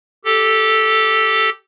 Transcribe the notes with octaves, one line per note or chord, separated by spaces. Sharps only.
G4 A4